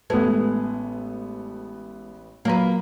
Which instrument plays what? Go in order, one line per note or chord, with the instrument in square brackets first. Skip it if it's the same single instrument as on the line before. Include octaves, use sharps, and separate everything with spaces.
[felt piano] A1 B4 [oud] G#3 [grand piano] A3 B3
[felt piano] A#2 [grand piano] F#3 A#5 [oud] A#3 B4